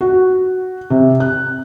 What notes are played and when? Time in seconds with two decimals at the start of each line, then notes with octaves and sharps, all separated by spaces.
0.01 F#4
0.90 C3
1.20 F#6